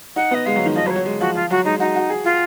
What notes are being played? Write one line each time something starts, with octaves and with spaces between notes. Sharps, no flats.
D#4 F#5
B3 D#5
G#3 F5
F#3
D#3
F3 D#5
F#3 B4
C#5
F#3
G#3
F3 F#4
F3 F4
F#3 F#4
G#3 D#4
D#4 F#4
F#4
G#4
F4